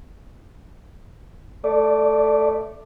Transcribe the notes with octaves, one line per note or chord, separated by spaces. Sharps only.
A3 D5